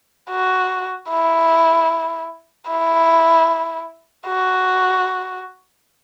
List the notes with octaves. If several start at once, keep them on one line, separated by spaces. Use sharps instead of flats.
F#4
E4
E4
F#4